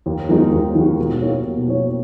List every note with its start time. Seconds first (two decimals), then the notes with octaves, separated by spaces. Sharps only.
0.06 D#2
0.29 D#3 G#3 D#4 F#4
0.52 D#2
0.75 D#3 G#3 D#4 F#4
0.98 B2
1.22 A#3 D#4 F#4 C#5
1.45 B2
1.68 A#3 D#4 F#4 C#5